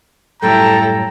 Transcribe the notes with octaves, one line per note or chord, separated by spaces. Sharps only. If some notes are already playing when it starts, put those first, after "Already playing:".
F#2 A2 G3 E4 A4 G5 A#5